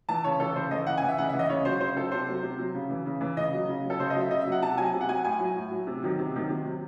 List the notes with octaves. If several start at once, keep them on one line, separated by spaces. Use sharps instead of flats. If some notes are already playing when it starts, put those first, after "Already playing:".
E3 A5
C#3 C#5
E3 A4
C#3 C5
E3 D#5
C#3 F#5
G#5
E3
E5
C#3 F#5
E5
E3
D#5
C#3 C#5
F#3 C5
C#3 C5
F#3 A4
C3 C5
F#3
C3
F#3
C#3
E3
C#3
E3
C#3 D#5
F#3
C#3
F#3
A4
C#3 C5
D#5
F#3
E5
C#3 D#5
E5
F#3
F#5
C3 A5
F#3 G#5
C3
F#5
F#3 G#5
A2 G#5
F#3
A2
F#3
C3
D#3 F#3
C3
D#3 F#3
C3
F#3